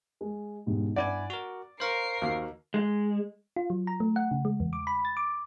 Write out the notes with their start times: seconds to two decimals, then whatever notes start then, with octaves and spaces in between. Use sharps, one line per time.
0.21 G#3
0.66 E1 G#2 G4
0.96 G2 E4 D5 F#5 G#5
1.30 F#4 A#4
1.80 A#4 C5 F5 C#6 C7 F#7
2.22 D#2 F#4
2.74 G#3
3.56 F4
3.70 F#3
3.87 A#5
4.00 A3
4.16 F#5
4.31 C#3
4.45 G#3
4.60 E2
4.73 D6
4.87 B5
5.05 A6
5.17 D6